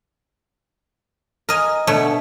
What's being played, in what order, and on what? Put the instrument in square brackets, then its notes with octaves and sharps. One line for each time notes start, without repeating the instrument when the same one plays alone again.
[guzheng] A#4 D#5 G#5
[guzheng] B2 A3 C#5 [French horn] D3